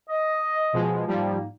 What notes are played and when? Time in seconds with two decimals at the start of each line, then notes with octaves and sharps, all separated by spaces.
0.09 D#5
0.73 B2 F3 G#3
1.07 G#2 F3 G3 A#3 D#4